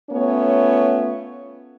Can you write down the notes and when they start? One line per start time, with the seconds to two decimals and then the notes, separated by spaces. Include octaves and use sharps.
0.11 A3 B3 C#4 F4 C#5